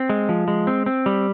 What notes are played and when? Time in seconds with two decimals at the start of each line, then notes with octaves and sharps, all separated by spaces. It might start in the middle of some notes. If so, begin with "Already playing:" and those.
Already playing: C4
0.10 G#3
0.29 F3
0.48 G#3
0.67 C4
0.86 C4
1.06 G3